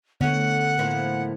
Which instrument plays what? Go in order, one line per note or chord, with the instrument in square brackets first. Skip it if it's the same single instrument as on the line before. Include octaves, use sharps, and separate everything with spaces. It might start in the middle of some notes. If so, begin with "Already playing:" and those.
[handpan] D3 B3 [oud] A3 C#4 [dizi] F#5
[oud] A2 F3 A#3